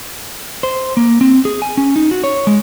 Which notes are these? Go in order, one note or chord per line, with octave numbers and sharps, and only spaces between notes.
C5
A#3
C4
G#4
G#5
C#4
D#4
F#4
C#5
G#3